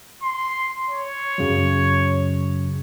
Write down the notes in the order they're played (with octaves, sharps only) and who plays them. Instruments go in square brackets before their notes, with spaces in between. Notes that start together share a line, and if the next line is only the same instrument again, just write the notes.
[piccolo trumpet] C6
C#5
[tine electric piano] F#2 C#3 F#3